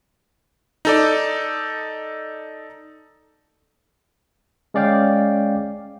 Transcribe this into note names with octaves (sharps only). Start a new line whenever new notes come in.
D#4 A4 D5
G#3 C#4 D5 F5 G5